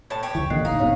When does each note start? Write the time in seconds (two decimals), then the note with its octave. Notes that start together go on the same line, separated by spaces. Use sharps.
0.10 A2 A5
0.23 G4 C#5
0.35 C#2 E3
0.50 B1 A#2 D3 D#5 F#6 C7
0.65 D1 D#4 F5
0.79 D#1 G#1 B2 C4 C#5 F5